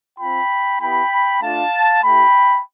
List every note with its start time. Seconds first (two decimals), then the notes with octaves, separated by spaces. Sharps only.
0.19 C4 F4 G5 B5
0.81 B3 E4 G4 G5 B5
1.42 A3 D4 F4 F5 A5
2.03 A3 E4 G4 G5 B5